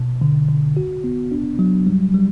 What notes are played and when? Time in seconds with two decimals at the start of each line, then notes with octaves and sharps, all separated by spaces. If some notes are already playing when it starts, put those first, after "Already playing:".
Already playing: B2
0.21 D3
0.49 D3
0.77 F#4
1.04 B3
1.32 D4
1.59 F#3
1.87 G3
2.14 G3